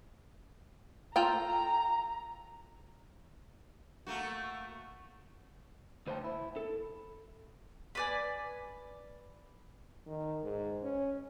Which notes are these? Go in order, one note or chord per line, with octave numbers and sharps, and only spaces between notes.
F4 A4 G5 A#5
A3 A#3 F#4
D2 B4 C5 D5 G5 A5
E4
A4
B4 D5 G#5
D#3
G#2
C#4